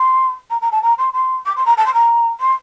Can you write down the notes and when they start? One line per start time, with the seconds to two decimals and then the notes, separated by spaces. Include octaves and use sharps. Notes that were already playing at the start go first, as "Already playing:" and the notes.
Already playing: C6
0.50 A#5
0.61 A#5
0.71 A5
0.82 A#5
0.98 C6
1.13 C6
1.45 D6
1.56 C6
1.66 A#5
1.77 A5
1.86 C6
1.93 A#5
2.40 C6